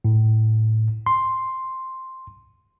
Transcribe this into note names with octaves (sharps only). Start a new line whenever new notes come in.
A2
C6